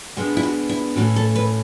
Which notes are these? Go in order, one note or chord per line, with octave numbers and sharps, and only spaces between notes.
B2 G#3 B3 D4 F#4
E4
F#4
E4
A2 E3 A3 C#4 F#4
A4
B4